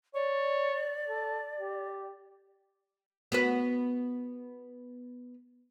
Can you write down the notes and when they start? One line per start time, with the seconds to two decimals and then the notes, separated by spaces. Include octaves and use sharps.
0.14 C#5 D5
1.07 A4
1.58 G4
3.32 B3 F#4 B4